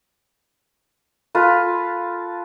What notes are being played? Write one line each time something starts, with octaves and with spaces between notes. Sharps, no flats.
F4 A4 B4